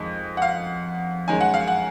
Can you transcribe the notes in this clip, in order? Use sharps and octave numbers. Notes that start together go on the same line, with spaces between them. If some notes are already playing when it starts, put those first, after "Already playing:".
Already playing: F2 D#3 G#3 D#5
F#5
F5
F#2 D#3 G#3 G#5
F#5
F5
F#5